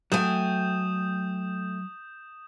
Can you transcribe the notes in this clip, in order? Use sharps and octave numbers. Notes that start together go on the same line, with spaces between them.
F#3 A3 G5 G#5 D#6 G6 E7